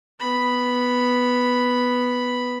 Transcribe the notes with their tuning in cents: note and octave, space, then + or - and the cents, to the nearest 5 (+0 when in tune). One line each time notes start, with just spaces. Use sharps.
B3 +0 B5 +0